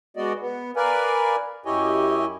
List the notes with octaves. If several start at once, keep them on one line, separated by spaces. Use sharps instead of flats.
G#3 B3 F#4 D5 D#5
B3
A#4 B4 D5 F5 G#5
F#2 E4 G4 C#5 D#5 G#5